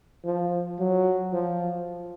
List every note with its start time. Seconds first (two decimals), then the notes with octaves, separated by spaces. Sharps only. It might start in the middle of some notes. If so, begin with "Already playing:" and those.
0.25 F3
0.79 F#3
1.33 F3